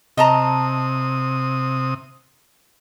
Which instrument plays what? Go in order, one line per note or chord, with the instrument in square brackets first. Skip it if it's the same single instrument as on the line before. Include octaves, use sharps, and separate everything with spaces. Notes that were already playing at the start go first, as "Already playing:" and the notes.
[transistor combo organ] C3 D#6 [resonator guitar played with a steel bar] D#5 A5 A#5